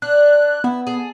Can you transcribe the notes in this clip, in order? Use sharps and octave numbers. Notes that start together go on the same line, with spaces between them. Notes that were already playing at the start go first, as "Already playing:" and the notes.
D4 F#6
B3 E4
G#4 A4